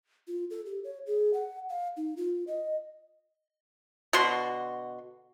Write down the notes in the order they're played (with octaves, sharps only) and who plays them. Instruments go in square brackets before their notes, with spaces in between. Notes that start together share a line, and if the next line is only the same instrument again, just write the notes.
[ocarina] F4
A4
G4
C#5
G#4
F#5
F5
D#4
F4
D#5
[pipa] B2 D3 F#4 C6